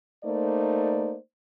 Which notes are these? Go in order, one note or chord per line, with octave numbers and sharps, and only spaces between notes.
A3 A#3 D#4 C5 D5